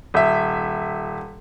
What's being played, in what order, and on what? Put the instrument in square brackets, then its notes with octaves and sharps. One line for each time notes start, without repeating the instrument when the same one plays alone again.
[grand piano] D#1 E5